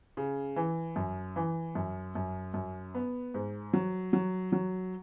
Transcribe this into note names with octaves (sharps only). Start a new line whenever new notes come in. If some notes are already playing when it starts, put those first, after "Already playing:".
C#3
E3
F#2
E3
F#2
F#2
F#2
B3
G#2
F#3
F#3
F#3